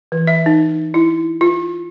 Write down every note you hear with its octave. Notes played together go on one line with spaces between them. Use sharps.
E3
E5
D#4
E4
F4